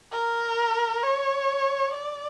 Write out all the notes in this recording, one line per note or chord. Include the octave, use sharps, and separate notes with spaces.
A#4
C#5
D5